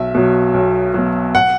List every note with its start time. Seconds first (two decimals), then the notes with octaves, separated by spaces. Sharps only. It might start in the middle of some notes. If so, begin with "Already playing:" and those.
Already playing: B1 E5
0.15 B2 F#3
0.54 B1
0.94 B2 F#3
1.35 F#5